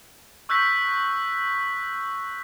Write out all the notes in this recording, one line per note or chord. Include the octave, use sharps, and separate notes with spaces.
C#6 E6 F#6 G6 A#6 B6